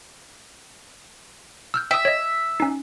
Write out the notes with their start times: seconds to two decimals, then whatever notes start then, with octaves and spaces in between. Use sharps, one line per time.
1.74 E6 F6 G6
1.91 E5 G5 D#6
2.05 C#5 D#5
2.60 C#4 D#4